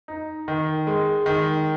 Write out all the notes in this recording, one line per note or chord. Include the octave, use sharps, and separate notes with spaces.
D#4
D#3
G#3
D#3